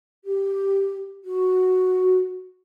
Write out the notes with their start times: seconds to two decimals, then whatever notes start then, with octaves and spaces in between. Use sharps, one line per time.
0.25 G4
1.25 F#4